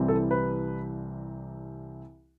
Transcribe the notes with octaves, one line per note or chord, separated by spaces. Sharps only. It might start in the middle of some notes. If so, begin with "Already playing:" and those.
Already playing: C2 C3 E3 G3 C4
A4
B4